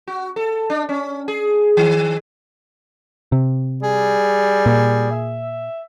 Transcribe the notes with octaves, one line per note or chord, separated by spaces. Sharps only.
F#4
A4
D4
C#4
G#4
D#3
C3
G3 G#4
A#2
E5